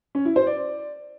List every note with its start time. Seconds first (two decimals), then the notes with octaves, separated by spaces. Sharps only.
0.15 C#4
0.25 E4
0.36 C5
0.47 D5